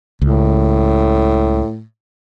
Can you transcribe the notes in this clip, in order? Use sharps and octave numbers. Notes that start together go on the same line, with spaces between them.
C#2 A2